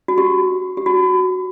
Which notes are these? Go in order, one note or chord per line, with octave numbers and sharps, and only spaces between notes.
F#4
G4
G4
F#4